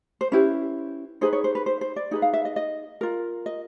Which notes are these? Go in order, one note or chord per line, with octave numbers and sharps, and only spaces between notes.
C5
C#4 E4 G4 B4
D#4 G#4 B4 C5
C#5
C5
B4
C5
C5
D5
D#4 G#4 B4
F5
E5
D#5
D#5
F4 A#4
D#5